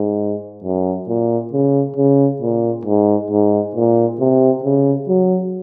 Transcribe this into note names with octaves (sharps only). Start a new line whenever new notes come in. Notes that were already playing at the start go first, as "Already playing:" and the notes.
Already playing: G#2
F#2
A#2
C#3
C#3
A#2
G#2
G#2
A#2
C3
C#3
F#3